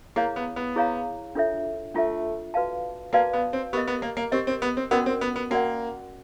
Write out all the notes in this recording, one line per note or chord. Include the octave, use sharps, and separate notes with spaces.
A#3 E4 G#4 C#5 F5 A#5
B3
B3
E4 G#4 C#5 F5 A#5
D4 F4 A4 C#5 E5
A3 D4 F4 A4 C#5 E5
F#4 B4 D5 F5 A5
A#3 F#4 B4 D5 F5 A5
B3
C4
B3 G4 A#4 D#5
B3
A#3
A#3
C4 G4 A#4 D#5
C4
B3
C4
B3 C#4 F#4 A#4 D5 F#5
C4
B3
B3
A#3 C#4 F#4 A#4 D5 F#5